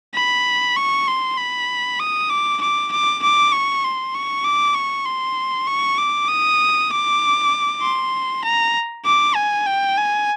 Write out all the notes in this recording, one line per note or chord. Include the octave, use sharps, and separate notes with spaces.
B5
C#6
C6
B5
D#6
D6
D6
D6
D6
C#6
C6
C#6
D6
C#6
C6
C#6
D6
D#6
D6
C6
A#5
D6
G#5
G5
G#5